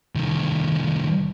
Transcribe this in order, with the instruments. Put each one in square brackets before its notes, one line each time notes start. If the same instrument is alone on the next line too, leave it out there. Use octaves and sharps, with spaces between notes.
[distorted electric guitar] C2 D#3